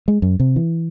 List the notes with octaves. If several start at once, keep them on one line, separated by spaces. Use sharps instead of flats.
G#3
F#2
C3
E3